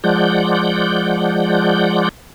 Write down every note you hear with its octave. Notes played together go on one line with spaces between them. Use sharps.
F3 G#3 D5 F#5 G6